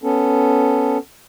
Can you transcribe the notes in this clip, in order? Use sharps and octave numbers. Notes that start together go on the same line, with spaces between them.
B3 C#4 A4